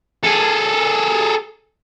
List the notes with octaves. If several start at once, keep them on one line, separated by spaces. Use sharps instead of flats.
G#4 A4